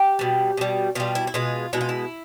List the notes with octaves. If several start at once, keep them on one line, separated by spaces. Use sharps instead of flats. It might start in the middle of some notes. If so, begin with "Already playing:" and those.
Already playing: G4
B2 G3
B2 G3
B2 G3 F4
E4
E4
B2 G#3 F4
B2 G#3 E4
F4
E4